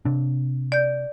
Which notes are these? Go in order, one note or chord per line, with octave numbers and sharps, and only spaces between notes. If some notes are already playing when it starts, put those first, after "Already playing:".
C3 D4
D5 G6